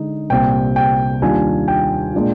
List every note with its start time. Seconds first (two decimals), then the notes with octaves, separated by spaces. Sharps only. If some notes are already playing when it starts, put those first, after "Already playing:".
Already playing: D3 G#3 D#4
0.30 C2 A#2 G3 C4 G5
0.76 G5
1.22 D#2 D#3 G3 D4 F4 G#5
1.68 G5
2.14 A#2 G#3 D4 F4